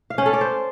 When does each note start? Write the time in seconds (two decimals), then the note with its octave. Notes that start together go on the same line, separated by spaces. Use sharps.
0.10 F5
0.18 C#4
0.26 A4
0.33 D5
0.41 C5